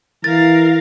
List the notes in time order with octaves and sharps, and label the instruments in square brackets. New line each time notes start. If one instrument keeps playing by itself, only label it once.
[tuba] E3 [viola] A#4 F5 [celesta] A6